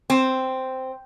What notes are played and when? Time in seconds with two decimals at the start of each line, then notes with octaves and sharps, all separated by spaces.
0.10 C4